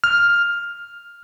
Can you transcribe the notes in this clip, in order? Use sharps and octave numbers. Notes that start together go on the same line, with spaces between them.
F6